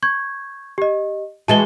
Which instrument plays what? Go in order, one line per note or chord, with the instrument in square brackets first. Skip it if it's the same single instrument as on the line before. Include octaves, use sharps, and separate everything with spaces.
[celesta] C#6 G6 G#6
G4 D#5
[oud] E3 G#3 F#4 [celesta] A5 A6 G7